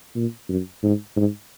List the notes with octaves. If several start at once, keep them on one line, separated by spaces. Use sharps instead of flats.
A#2
F#2
G#2
G#2